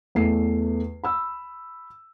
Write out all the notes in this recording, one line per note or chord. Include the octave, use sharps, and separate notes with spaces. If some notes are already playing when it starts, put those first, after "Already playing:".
E2 A3 C7
B5 E6